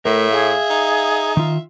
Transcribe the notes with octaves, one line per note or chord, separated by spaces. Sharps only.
A2 A3 A#4 E5
G#4 F5
D#4
D#3 F4